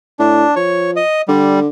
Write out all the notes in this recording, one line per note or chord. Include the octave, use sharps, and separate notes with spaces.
A2 D4
F3 C#5
D#5
D3 G3